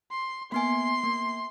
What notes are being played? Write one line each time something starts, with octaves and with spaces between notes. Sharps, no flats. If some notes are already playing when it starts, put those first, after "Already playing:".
C6
A#3 B3 G#5 C6
A#3